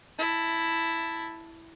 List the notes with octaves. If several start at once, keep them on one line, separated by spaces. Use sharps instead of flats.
E4 A5